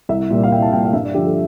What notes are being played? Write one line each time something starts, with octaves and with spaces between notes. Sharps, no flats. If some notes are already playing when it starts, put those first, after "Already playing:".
C2 E5
A#2 G3
F5
C2 G5
A5
A#2 G3 G5
F5
G2 E5
D5
D3 F3 G4
A4